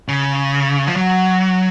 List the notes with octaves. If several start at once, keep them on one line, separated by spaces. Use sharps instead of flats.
C#3
F3
F#3